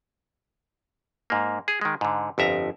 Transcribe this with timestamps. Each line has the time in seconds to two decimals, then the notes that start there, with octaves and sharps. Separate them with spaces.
1.30 G#2 A#3
1.68 G#4
1.81 D#3 G#3
2.01 G#2 D3
2.38 G1 F2 E5 A#5